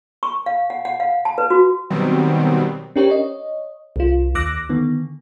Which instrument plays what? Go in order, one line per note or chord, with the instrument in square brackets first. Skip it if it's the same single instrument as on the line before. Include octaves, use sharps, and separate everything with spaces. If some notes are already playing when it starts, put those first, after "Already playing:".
[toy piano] C#6
F5
F#5
F#5
F5
A5
B4
F#4
[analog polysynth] B2 D#3 F#3 G3 B3 C4
[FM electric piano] C#4 D4 G4 A#4 C5 C#5
C#5 D#5
C2 F4
D#2 D6 E6 F#6 A#6
D3 D#3 B3